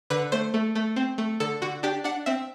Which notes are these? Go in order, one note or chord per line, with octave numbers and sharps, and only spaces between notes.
D3 B4
A3 C5
A3
A3
C4
A3
D3 A4
D3 F#4
D4 G4
D4 F#5
C4 E5